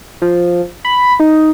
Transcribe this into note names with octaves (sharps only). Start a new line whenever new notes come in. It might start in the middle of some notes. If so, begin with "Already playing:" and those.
F3
B5
D#4